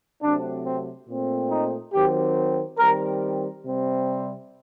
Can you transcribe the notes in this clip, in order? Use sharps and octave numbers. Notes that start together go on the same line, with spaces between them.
C3 F#3 A3 C4 D4
C4
A#2 A3 C4
D#4
D#3 F#3 C4 G4
D#3 G3 C4 A#4
C3 G3 C4